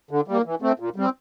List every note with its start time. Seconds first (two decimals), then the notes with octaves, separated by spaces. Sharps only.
0.11 D3
0.28 G3 A#3
0.45 E3
0.62 A3 C4
0.79 A#2
0.96 G3 C4